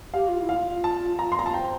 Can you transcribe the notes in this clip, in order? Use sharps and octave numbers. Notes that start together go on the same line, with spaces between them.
G4 F5
F4
E4
F5
F4
A5
A#5
C6
A#5
A5
C5 G5